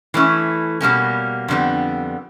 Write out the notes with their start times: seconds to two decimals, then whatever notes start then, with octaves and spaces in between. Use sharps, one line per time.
0.14 E3 A3 C#4 E4
0.81 B2 G3 A#3 C#4
1.48 F2 D3 G3 B3